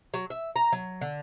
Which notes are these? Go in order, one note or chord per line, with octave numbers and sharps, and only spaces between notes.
F#3
E5
A#5
F#3
D3